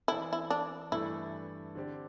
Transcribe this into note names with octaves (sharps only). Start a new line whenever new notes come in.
E3 C4 E4 A4 D5
E4
D4
G2 E3 A3 D4 E4 A4
D3 C4 G4 D5